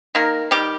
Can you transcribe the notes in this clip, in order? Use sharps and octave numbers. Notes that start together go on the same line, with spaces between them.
D#3 A#3 A#4
D#3 G3 G4